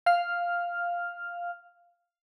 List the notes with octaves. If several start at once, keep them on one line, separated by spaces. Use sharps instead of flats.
F5 F6